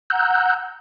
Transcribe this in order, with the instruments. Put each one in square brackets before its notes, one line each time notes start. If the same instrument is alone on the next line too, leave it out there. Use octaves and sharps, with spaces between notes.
[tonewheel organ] F#5 A#5 E6 F#6 G6